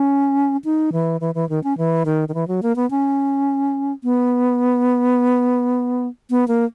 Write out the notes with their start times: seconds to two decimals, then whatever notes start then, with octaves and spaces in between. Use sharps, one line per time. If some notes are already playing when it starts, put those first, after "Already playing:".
Already playing: C#4
0.64 D#4
0.92 E3
1.21 E3
1.35 E3
1.49 D#3
1.64 C#4
1.78 E3
2.05 D#3
2.29 D#3
2.34 E3
2.48 F#3
2.63 A#3
2.76 B3
2.91 C#4
4.04 B3
6.30 B3
6.48 A#3